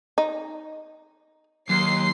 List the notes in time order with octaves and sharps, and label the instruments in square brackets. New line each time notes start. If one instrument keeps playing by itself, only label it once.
[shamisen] D#4
[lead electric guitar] D#2 [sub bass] F#3 [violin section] C6 C7